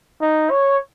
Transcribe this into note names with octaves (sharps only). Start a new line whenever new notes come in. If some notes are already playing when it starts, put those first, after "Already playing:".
D#4
C#5